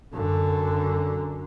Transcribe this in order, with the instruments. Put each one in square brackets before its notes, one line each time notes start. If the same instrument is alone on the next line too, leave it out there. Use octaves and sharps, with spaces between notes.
[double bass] F#2 D3